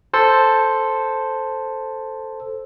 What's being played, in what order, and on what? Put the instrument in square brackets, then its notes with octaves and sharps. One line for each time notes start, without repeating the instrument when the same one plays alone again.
[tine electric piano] A4 C5